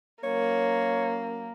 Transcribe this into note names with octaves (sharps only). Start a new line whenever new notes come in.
F#3 A#3 C#4 A#4 C#5